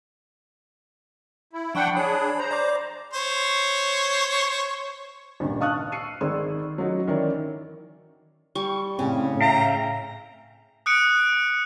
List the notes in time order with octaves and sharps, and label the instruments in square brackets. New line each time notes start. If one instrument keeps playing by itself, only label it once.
[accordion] E4
[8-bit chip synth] F3 C#6 [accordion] D4 F#5 G5
[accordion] D4 G#4 [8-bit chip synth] C#5 B5
[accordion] C5 A#5
[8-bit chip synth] D5 D6
[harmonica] C5 C#5
[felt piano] G#1 C#2 G2 A#2
F5 A5 C#6 D#6 F6 F#6
C#6 E6 C7 C#7 D#7
G#1 D#3 G#4 D5 C6 E6
F#3 C#4 D#4 F#4
D#3 E3 C#4 A#4 D5
[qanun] G3 [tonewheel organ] C#6
[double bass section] A2 [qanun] C#3 [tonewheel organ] C4
[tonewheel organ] E5 F5 G5 [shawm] A#5
[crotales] D#6 F#6 C#7 D7